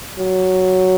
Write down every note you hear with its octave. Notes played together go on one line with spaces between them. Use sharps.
F#3